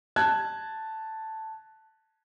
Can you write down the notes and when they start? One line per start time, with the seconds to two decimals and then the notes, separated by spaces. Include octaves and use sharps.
0.16 A5 F#6 G#6